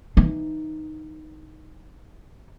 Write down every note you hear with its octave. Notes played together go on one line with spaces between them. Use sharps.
E3 D#4